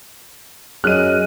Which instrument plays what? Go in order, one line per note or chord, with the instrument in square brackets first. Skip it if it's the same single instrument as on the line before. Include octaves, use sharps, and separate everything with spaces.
[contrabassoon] F#2 [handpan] G#4 D#5 [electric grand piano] F6 [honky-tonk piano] F#6 D#7